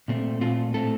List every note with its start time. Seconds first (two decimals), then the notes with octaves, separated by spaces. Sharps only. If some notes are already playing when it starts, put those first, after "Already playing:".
0.08 A#2 A3 C4
0.41 A#2 A3 C4 F4
0.74 A2 A3 C4 A4